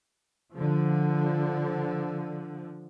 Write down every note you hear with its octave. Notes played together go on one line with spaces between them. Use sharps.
D3 F3